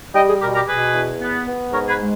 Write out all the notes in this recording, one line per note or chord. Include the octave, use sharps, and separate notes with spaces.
G3 D#5 G5
G#4
B2 G4 A#4
G4 A#4
B2 G#4 B4
E2
B3
B3
G#2 A#4 C#5
G#4 B4
G#3